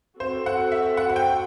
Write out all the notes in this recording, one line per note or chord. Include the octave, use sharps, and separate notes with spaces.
C4 F#4 A4 C5
F#5
E5
F#5
F#5
G5